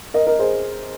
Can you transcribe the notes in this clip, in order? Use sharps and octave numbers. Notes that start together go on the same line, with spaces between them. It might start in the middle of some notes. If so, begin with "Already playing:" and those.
A#4 D#5
A#4 D#5
G#4 C5